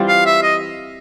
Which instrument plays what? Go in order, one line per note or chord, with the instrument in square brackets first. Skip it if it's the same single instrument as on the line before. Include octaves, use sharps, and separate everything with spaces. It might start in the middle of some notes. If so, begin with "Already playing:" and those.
Already playing: [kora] E3 G3 C4 F4
[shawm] F5
E5
D#5